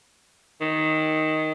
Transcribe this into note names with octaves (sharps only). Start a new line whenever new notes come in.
D#3